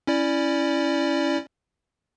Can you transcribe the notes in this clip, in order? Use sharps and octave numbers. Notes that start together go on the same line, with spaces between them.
C#4 E4 D5